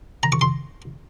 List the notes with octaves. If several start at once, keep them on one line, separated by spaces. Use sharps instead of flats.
A#5
C#6
C6